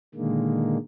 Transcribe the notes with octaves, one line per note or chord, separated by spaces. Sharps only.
A#2 D3 D#3 G#3 A#3